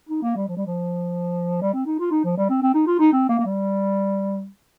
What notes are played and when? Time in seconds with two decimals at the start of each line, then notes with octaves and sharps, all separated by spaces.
0.09 D#4
0.22 A#3
0.35 G3
0.48 F3
0.57 G3
0.66 F3
1.62 G3
1.73 C4
1.86 D#4
1.99 F4
2.11 D#4
2.24 F3
2.37 G3
2.49 C4
2.62 C4
2.74 D#4
2.87 F4
2.99 D#4
3.12 C4
3.29 A#3
3.39 A#3
3.46 G3